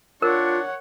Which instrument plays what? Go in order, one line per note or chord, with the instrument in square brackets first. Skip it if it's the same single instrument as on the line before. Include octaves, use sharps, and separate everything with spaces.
[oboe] D4 [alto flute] F4 [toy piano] A#4 [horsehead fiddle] C#5 F#5